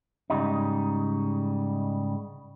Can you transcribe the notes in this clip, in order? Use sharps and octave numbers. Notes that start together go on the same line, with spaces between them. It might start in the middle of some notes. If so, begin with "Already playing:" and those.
G#2 C#3 G3 D#4